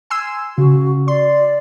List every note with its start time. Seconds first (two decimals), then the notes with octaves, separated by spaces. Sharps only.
0.10 G#5 C6 E6
0.58 C#3 F#4
1.08 D5 C6